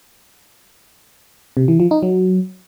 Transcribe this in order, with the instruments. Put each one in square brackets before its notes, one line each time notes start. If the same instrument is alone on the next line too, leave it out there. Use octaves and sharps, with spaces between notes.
[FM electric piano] C3
E3
F3
D#4
F#3